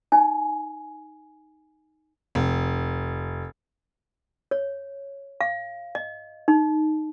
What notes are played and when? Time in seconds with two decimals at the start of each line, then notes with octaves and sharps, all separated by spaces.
0.12 D#4 G#5
2.35 F1
4.51 C#5
5.41 F5
5.95 D#5
6.48 D#4